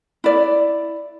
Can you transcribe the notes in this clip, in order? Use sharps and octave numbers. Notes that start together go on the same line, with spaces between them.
E4 D5